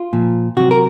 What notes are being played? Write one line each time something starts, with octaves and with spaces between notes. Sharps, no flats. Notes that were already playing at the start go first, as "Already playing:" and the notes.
Already playing: F4
A#2 F3
C3 F#3 F#4
A#4